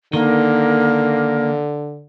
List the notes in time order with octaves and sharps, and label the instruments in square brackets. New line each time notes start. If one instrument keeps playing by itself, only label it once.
[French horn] D3 [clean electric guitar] D#3 [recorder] A#3